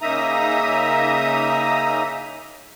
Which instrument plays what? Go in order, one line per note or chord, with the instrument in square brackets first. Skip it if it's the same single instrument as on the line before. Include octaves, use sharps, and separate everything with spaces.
[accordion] C#3 A#3 D#4 E5 A#5 D#6